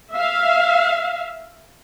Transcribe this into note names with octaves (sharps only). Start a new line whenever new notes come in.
E5 F5